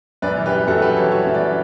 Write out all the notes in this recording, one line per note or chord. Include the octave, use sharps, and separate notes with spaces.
F#2 B4 D5
E3
G4 B4
G3
F#2 F#4 A4
F#2 G4 B4
E3 A4 C#5
G3 C#5 E5
F#2
B4 D5